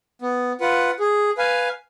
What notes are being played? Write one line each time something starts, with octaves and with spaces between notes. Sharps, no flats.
B3
F4 B4 F#5
G#4
B4 F5 G#5